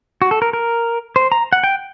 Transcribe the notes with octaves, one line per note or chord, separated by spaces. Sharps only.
F#4
A4
A#4
A#4
C5
A#5
F#5
G5